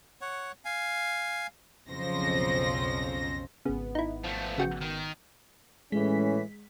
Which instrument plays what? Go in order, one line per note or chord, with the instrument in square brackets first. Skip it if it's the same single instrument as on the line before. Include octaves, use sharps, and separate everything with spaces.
[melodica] C#5 F#5
F5 G#5
[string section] B1 F2 C#3 F3 C5 A#6
[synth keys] G#1 B3 [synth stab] C#3
[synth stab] D#4 E4
[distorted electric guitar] F3 A3
[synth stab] C#3 F#4 G5
[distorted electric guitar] D#3
[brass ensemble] A2 E3 C#4 [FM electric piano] G#3 B6